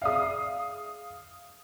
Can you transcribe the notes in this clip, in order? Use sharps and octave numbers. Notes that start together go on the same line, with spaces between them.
G#4 D5 E5 F5 D#6